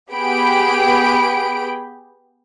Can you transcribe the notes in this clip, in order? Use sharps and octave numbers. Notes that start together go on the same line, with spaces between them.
B3 G4 G#4 G5 B5 D7